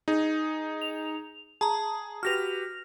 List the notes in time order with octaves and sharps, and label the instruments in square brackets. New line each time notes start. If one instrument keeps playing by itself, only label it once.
[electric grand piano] D#4 G#4
[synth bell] F7
[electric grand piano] G#4 [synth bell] A5 A#5
[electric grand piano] F#4 G4 B4 [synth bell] F6 A#6 F7